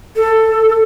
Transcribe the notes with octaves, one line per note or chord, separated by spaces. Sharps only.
A4